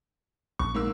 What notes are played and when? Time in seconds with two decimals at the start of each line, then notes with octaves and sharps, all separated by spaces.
0.59 A#1 C#6
0.75 G#2 A#3 E6